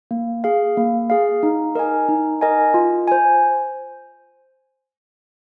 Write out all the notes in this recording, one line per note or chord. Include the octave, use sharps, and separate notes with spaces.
A#3
G#4 F5
A#3
G#4 F5
D#4
A#4 D#5 G#5
D#4
A#4 D#5 G#5
F4
C5 G#5